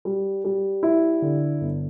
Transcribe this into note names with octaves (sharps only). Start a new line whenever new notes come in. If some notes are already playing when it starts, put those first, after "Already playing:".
G3
G3
E4
D3
G1